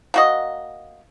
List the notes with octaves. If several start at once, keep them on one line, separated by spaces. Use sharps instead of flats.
A#3 F#4 D#5